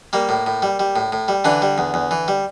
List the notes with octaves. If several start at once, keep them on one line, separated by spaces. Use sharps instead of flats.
G3 A#3
A2
A2
G3
G3
A2
A2
G3
D3 E3 D4
G3
E2
E2
E3
G3